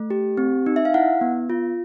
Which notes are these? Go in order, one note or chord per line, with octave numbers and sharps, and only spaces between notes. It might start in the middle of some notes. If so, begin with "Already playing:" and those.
Already playing: A3
G4
C4
D#4
E5
F5
E4 F#5
B3
F4